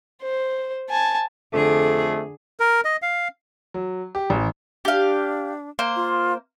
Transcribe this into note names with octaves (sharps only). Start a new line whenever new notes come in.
C5
G#5 A5
F2 D3 A3 G#4
A#4
D#5
F5
F#3
G4
A1
D4 G4 F5
A#3 C5
F4